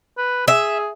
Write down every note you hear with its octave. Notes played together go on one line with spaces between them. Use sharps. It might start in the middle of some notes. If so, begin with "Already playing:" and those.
B4
G#4 E5